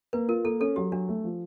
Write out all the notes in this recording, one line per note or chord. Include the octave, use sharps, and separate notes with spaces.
A#3 B4
F4 A#4
A#3 A4
C#4 A4
F#3 G4
F#3 D4
A3
F3